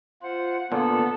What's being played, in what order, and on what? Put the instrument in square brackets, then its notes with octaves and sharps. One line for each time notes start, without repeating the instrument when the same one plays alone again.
[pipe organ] F4 C5 [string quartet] F#5
[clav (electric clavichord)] A#2 D3 [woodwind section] B3 [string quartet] A4 [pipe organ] F#5